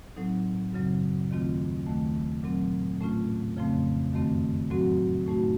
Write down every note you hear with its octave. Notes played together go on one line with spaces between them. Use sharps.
A2 F#3 C4 D#4
F#2 C#3 F#3 C4
D#2 D#3 A3 C4 F4
D#2 D#3 A3
A#2 F#3 C4
A2 A3 C#4 F4
F2 C#3 F3 A3 C4
F#2 D#3 A3 C4
A2 F#3 C4 F#4
A2 A3 D#4 F#4